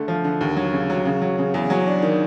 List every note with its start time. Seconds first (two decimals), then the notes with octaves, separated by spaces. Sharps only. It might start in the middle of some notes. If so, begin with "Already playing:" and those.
Already playing: D3 A3
0.08 F3
0.24 D3
0.41 D#2
0.56 F#3
0.73 C#3
0.90 F#3
1.05 C#3
1.22 F#3
1.38 C#3
1.54 E2
1.70 F#3
1.87 D4
2.02 D#3